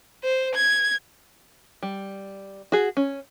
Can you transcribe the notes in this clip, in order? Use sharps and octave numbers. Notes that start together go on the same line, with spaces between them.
C5
G#6
G3
F#4 G#4
C#4